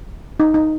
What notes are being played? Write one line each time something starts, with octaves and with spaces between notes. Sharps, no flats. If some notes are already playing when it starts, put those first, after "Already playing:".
D#4
D#4